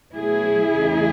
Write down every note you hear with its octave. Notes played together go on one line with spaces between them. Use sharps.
B2 F#3 A3 E4 G#4
E2 C#3 E3 A3